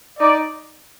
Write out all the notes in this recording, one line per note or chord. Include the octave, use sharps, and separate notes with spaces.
D#4 D5